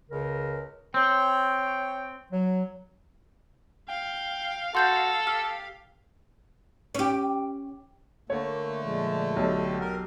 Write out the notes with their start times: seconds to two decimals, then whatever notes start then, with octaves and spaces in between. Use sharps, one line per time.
0.09 C#2 C#3 A#4
0.94 C4 C#5 G5
2.32 F#3
3.89 F5 G5
4.75 F#4 A4 C6 G6 A6
5.27 G4 F6
6.95 C#4 G4
8.30 D3 A3 A#3 C#5
8.83 A#2 F3 G#3
9.36 B1 G4
9.80 A#4